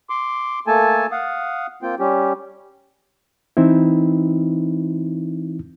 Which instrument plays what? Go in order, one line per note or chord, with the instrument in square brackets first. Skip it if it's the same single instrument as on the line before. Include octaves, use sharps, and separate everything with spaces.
[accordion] C6 D6
A3 A#3 A4 G#5 A5
F5 F#5 D#6
A#3 C4 F4 G5
G3 C#4 G4
[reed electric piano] E3 C4 D#4 E4